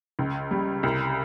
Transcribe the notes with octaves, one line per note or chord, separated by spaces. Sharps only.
C#2
G3
C2